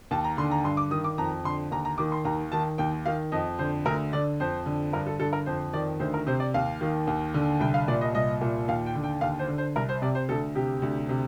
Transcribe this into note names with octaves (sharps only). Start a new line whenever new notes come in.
D#2 A5
A#5
D3 C6
A#5
G2 C6
D6
D#3 D#6
D6
F2 A#5
D3 C6
D#2 A#5
A#5
D#3 D6
C6
D#2 A#5
D#3 A5
D#2 G5
D#3 F5
F2 D#5
D3 C5
D2 A#4
D3 D5
F2 C5
D3
G2 A#4
A4
D3 A4
A#4
F2 C5
D#3 D5
D2 C5
A#4
C3 C5
D5
D#2 F5
D#3
D#2
D3
C2 G5
F5
A#2 D5
D#5
C2 D#5
A#2
D#2 F5
G5
D3
G5
D#2 F5
C5
D3
C5
C2 A#4
C5
C3 D5
C5
D2 A4
C3 G4
D2
C3